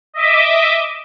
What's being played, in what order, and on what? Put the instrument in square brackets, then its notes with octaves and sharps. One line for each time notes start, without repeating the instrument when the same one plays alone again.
[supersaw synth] D#5 E5 D6